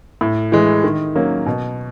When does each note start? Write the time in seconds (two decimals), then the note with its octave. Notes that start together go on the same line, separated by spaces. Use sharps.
0.21 A2
0.52 E3 G#3
0.84 D#3
1.15 F#3 A#3 C#4
1.46 B2